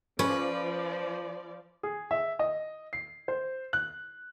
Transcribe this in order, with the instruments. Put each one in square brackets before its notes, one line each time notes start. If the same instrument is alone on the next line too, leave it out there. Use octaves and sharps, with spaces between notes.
[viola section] F3 D5 [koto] C#4 [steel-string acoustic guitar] B4
[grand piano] G#4
E5
D#5
C7
C5
F#6